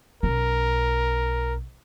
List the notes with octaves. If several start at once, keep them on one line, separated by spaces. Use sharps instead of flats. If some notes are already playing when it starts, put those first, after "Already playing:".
B1 C#4 A#4